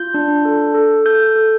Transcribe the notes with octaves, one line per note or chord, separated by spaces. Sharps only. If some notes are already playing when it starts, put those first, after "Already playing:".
Already playing: F4 G6
D4
A4
A4
A4 G6
A4